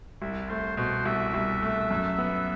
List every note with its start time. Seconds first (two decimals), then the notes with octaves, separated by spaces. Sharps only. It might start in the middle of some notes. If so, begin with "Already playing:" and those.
0.22 C2 E4
0.49 A3 C5
0.77 B2 C5
1.05 C2 E5
1.34 C2
1.62 A3
1.91 F#2
2.19 B3